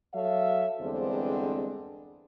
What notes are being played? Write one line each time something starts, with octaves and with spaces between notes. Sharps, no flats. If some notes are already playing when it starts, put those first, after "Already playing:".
F#3 A4 C#5 E5 F5
E2 G2 D3 G#3 C4 C5